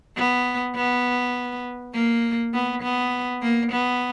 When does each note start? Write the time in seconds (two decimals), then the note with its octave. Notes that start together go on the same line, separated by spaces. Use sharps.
0.17 B3
0.75 B3
1.94 A#3
2.54 B3
2.83 B3
3.42 A#3
3.72 B3